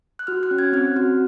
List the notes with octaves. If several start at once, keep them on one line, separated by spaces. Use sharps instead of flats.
F#6
F#4 F6
F#6
C#4
G#6
C4 F6
F#4